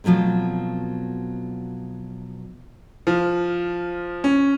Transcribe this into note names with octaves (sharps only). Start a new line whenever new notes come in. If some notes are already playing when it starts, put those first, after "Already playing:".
B2 F3 F#3 A3 C4
F3
C#4